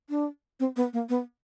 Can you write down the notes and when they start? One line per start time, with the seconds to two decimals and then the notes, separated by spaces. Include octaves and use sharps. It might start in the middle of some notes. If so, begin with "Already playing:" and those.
0.09 D4
0.60 C4
0.76 B3
0.93 A#3
1.09 B3